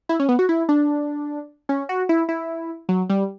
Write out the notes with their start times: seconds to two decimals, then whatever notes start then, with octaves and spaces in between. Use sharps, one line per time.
0.09 E4
0.20 C#4
0.29 B3
0.39 F#4
0.49 E4
0.69 D4
1.69 C#4
1.89 F#4
2.09 E4
2.29 E4
2.89 F#3
3.10 G3